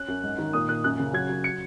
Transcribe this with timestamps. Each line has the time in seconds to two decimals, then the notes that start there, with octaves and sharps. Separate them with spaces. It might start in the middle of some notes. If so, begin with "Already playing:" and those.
Already playing: C#4 F#6
0.08 F#2
0.23 G#2
0.38 D#3
0.53 A#2 D#6
0.69 A#2 F#6
0.84 F#2 F#6
0.99 C#3
1.13 F#3 G#6
1.29 F#3
1.44 C#7